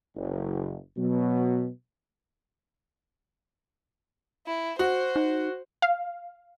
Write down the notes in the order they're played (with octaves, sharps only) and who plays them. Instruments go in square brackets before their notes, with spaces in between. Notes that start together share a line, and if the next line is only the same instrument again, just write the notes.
[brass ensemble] F#1
B2 F#3 B3
[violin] E4
[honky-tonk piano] F#4 [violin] C5
[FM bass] D#4
[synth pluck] F5